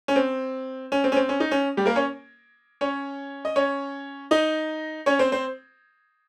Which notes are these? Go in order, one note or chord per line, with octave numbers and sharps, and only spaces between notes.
C#4
C4
C#4
C4
C#4
C4
C#4
D#4
C#4
G3 G4
A#3 A#4
C#4 C#5
C#4 C#5
D#5
C#4 C#5
D#4 D#5
C#4 C#5
C4 C5
C4 C5